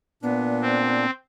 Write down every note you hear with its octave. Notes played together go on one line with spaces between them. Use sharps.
A#2 B3 D4
C4